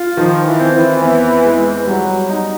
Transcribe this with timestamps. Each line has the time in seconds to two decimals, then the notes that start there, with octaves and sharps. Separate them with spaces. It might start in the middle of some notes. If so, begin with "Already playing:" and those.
Already playing: F4
0.17 D#3 F3
0.45 E3
0.60 C4
0.74 E3
1.02 E2
1.45 G#3
1.87 F#3 G3
2.30 D#4